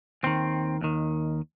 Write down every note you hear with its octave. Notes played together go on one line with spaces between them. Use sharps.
D#2 D#3 C4
D#2 D#3